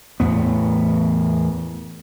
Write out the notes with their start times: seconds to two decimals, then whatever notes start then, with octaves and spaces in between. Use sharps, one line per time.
0.20 E2 A2 B3